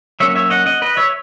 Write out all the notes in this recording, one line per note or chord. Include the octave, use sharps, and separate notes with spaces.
F#3 A#3 C#4 C#5 E5
C#5 E5
D#5 F#5
D#5 F#5
B4 D#5
C#5 E5